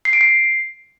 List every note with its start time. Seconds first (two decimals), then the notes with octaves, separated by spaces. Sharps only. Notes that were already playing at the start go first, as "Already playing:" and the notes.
0.05 C7
0.13 D7
0.21 C7